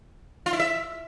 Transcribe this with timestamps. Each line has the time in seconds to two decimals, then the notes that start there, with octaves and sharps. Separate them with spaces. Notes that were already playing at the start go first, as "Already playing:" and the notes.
0.46 F4
0.53 E4
0.60 E5